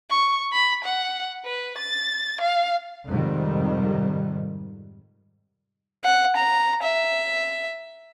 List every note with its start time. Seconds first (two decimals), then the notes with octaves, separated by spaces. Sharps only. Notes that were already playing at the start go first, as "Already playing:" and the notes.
0.10 C#6
0.53 B5
0.85 F#5
1.45 B4
1.78 A6
2.41 F5
3.09 F2 G#2 C3 D#3 G3
6.04 F#5
6.36 A#5
6.83 E5